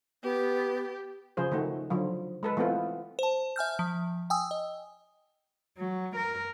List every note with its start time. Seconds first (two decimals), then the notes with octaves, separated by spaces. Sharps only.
0.23 B3 G4
1.37 C#3 F3 G#4 C5
1.52 D#3 A3 F#4
1.90 D3 F3 F#3
2.43 G#3 A4 B4
2.57 E3 A3 B3 C4 F4
3.19 C5 A5
3.56 E5 G#5 F6 G6
3.79 F3
4.30 G5 G#5 D#6 E6
4.51 D#5
5.78 F#3
6.16 A#4